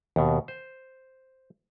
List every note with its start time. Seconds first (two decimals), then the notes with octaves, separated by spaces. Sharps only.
0.16 D#2 B2
0.48 C5